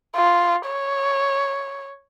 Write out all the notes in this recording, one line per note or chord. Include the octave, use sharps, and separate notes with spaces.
F4
C#5